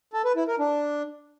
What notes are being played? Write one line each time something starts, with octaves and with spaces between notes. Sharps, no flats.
A4
B4
E4
A#4
D4